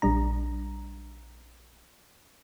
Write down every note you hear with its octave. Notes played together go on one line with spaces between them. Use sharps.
A#1 G3 D4 A#5